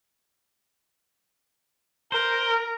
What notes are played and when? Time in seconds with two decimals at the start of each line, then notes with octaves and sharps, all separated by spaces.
2.12 A#4 C5